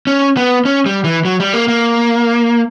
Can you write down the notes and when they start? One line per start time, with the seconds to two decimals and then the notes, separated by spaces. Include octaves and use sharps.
0.07 C#4
0.37 B3
0.65 C#4
0.86 G3
1.04 E3
1.25 F#3
1.40 G3
1.54 A#3
1.68 A#3